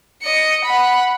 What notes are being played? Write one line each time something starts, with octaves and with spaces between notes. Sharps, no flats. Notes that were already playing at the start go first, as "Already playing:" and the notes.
D#5 C#7
F#5 B5